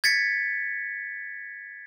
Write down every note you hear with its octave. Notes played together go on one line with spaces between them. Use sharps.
G#6 A6 B6 C#7